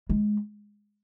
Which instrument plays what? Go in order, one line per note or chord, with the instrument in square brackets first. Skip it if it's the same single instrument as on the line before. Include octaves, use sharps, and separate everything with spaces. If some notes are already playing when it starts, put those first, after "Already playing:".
[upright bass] G#3